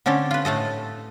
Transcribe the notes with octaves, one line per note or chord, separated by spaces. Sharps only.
D3 C4 C#4 G4 A4
F4 B4
A2 A3 A4 D#5